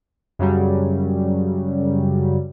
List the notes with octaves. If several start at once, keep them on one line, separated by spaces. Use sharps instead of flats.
F#2 C#3 F#3 G3